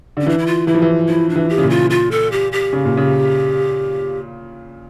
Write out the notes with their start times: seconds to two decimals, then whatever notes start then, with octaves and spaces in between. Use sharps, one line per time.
0.17 D3
0.21 C#4
0.26 E3 D4
0.38 E4
0.46 F4
0.67 E3 E4
0.75 F3
0.82 E3
1.09 F3 E4
1.30 D4
1.36 E3
1.49 G4
1.58 C#3
1.63 A#2
1.70 F4
1.90 F4
2.11 A4
2.32 G4
2.52 G4
2.73 C#3
2.85 A#2
2.97 C#3